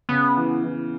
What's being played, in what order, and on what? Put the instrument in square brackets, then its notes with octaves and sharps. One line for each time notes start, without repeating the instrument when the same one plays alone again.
[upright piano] C#3 [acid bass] B3
[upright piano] E3
E3